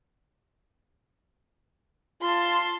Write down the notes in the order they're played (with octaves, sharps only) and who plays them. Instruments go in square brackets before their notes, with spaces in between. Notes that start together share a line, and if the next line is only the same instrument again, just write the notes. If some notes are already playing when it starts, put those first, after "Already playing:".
[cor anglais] F4 [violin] A5 C6